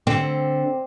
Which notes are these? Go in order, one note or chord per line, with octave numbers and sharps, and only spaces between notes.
D3 C4